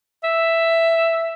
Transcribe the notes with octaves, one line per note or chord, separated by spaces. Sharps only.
E5